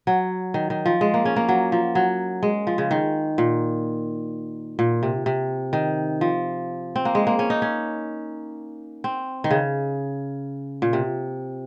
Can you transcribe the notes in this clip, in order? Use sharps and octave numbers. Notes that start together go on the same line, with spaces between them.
F#3
D#3
D#3
F3
G#3
A#3
C#4
A#3
F#3
F3
F#3
G#3
F3
C#3
D#3
A#2
A#2
C3
C3
D#3
F3
C4
A#3
G#3
A#3
C#4
D#4
C#4
C4
D#3
C#3
A#2
C3